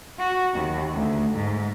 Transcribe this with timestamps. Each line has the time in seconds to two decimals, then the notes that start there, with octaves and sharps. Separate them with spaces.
0.19 F#4
0.54 D#2
0.94 D2
1.35 G#2